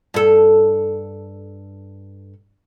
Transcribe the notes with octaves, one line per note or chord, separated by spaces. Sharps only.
G2 A4